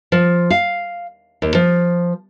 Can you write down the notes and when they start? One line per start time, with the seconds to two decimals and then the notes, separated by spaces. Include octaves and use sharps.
0.12 F3
0.50 F5
1.42 D#2
1.55 F3